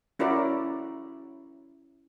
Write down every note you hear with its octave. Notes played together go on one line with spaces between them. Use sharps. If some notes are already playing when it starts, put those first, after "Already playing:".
C#4 E4 F#4 A#4 D5